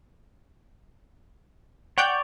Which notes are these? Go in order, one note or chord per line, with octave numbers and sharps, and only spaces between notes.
C#5 D5 F#5 G5 G6